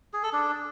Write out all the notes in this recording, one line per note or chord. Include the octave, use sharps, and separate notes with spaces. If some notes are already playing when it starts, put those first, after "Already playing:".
G#4
A4
D4